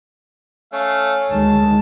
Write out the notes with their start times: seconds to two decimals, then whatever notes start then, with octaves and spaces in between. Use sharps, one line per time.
0.73 A3 C#4 F5
1.31 D2 D#3 G#3 A5